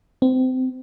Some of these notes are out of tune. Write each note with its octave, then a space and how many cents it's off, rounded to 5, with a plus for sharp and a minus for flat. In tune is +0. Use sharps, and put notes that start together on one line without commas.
C4 -25